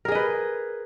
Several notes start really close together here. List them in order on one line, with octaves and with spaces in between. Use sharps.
A#4 G#4 D#5 B4